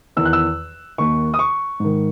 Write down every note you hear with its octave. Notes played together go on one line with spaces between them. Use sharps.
E2 D#3 E6
F#6
E6
D#2 D#3 C#6
D#6
C#6
G#2 D#3